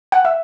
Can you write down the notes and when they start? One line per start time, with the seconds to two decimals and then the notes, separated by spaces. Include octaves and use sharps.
0.12 F#5
0.25 E5